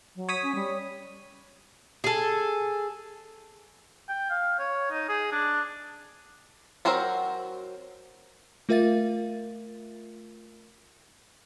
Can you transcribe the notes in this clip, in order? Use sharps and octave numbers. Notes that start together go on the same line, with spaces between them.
F#3
C#5 D#6 B6
C#4
G3
G#4 A4
G5
F5
C#5
D#4
G#4
D4
F#3 C4 F#4 A#4 C5
A3 F4 A#4 E5 F5 A6